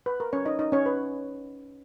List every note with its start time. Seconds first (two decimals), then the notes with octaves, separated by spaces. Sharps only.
0.06 B4
0.20 A#4
0.33 C#4 C#5
0.45 D#4 D#5
0.59 D#4 D#5
0.72 C#4 C#5
0.86 B4